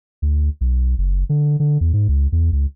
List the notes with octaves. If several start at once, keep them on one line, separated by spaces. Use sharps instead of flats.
D2
B1
F#1
D3
D3
E2
G#2
C#2
E2
C#2